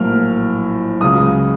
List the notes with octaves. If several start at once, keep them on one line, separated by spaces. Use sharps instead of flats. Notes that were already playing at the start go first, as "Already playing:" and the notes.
Already playing: A#1 A2 F#3 A#3 F6
C#2 C#3 F#3 D#6